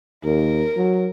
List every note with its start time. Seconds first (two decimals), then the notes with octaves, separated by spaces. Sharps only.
0.24 D#2 A#4
0.77 F#3